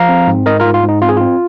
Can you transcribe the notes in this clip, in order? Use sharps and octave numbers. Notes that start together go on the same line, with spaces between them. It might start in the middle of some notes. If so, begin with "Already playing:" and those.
Already playing: F3 F5 A#5
C4
G#2
G#2 A#4 D#5
F4 A#4
G#2
F4
G#2
D#4
C4 F4
G#4
C4 F4